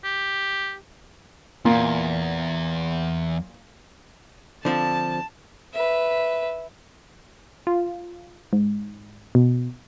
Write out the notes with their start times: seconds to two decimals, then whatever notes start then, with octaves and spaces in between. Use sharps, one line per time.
0.04 G4
1.65 E2 A#2
4.65 D3 F3 C4 A5
5.73 B4 E5
7.67 F4
8.53 G#2
9.35 B2